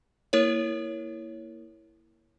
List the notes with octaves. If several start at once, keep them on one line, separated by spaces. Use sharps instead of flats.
A#3 E4 A#4 C#5